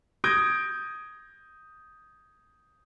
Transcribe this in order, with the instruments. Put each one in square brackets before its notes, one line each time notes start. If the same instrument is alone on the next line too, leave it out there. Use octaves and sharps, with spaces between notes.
[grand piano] D#6 G6 G#6 A#6 D7